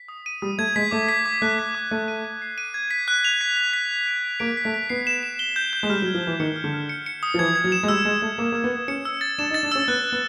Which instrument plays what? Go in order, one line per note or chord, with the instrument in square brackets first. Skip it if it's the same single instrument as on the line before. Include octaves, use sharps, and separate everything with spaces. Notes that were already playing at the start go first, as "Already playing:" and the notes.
Already playing: [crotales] B6
D#6
D#7
[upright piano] G3 [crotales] D#6
[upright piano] A3 [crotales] G#6
[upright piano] G#3 [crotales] B6
[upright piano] A3 [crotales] D6
[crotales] B6
D6
[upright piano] A3 [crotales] F#6
[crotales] B6
D6
[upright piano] A3 [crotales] D#7
[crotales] D#7
D#7
C7
D#7
G#6
B6
F#6
F7
B6
B6
B6
G#6
D7
D7
[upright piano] A#3 [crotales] D7
[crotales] B6
[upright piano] A3
[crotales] B6
[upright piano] B3 [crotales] C7
[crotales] E7
E7
G7
G6
G6
[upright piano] G#3
[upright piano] G3 [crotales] F6
[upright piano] F#3
[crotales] G#6
[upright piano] F3
[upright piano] E3 [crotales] F6
[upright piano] D#3 [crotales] C#7
[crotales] F6
[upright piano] D3
[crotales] F6
C#7
C#7
D#6
[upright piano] F3
[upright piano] E3 [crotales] G#6
[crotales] G#6
[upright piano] F#3
[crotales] E7
[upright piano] G#3
[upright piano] G3 [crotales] E6
[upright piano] G#3 [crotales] E6
[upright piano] A3 [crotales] E6
[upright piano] A#3 [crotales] E6
[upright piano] A#3 [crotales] E6
[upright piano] B3
[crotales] G#6
[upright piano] C#4 [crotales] C#7
[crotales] E6
A6
[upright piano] D4 [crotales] E7
[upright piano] D#4
[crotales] A6
[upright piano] D4
[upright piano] C#4 [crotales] E6
[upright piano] B3 [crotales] F#6
[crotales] F#6
[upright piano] B3